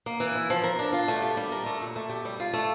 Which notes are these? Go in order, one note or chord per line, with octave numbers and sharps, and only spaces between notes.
A#3
E3
E4
F3
A#4
D4
F4
A3
G4
G3
A#4
A3
A#2
A3
G4
G3
F4
A3